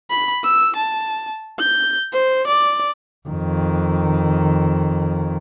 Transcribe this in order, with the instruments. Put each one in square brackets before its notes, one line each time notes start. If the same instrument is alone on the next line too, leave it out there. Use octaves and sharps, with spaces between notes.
[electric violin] B5
E6
A5
G6
C5
D5
[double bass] F2 D#3